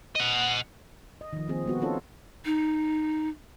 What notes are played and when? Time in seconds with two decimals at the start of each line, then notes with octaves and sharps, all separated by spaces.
0.15 D#5 F#5
1.21 D#5
1.33 D#3 F3
1.48 D#3 F3 A#3 C4 G#4
1.65 G3 B3 F#4
1.80 C4 C#4 D#4 F4 A4 C#5
2.45 D#4